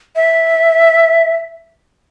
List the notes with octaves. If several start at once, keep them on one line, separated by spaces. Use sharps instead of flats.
E5